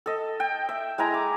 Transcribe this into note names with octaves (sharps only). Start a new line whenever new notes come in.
A4 D#5
G5
E5
G#3 E4 G#5 A#5
D6